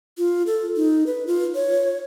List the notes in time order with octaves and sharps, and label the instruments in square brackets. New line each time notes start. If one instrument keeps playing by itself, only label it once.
[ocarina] F4
A4
D#4
B4
F4
C#5